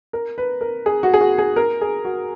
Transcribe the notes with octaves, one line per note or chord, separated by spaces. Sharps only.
A#4
B4
A#4
G#4
F#4
G#4
F#4
G#4
A#4
G#4
F#4